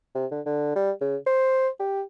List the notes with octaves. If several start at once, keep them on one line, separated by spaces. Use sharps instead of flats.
C3
D3
D3
G3
C#3
C5
G4